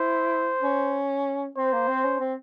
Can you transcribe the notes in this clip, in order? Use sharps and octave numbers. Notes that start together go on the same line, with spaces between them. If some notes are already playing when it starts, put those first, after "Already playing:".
Already playing: E4 C5
C#4
C4 C5
A#3
C4
C#4
C4